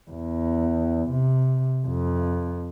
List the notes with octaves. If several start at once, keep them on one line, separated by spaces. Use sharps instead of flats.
E2
C3
F2